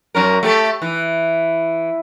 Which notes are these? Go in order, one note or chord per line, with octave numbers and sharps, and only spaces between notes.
F#2 C#4 A#4
A3 G4 A4
E3